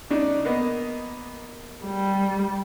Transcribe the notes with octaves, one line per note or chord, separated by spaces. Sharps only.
C#3 D4 D#4
A#3 B3 D#5
G3